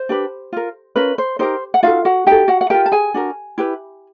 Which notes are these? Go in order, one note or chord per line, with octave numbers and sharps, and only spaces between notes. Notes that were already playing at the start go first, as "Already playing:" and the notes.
Already playing: C5
D4 G4 B4
F4 A#4
C#4 F4 A#4 B4
C5
D#4 G4 A#4 C5
F#5
D#4 F4 F#4 A4 F5
F#4 F#5
D#4 F#4 G4 A4 G5
F#4 F#5
F#5
F4 G4 A#4 G5
A5
G#4 G#5
D4 F#4 A#4
E4 G4 B4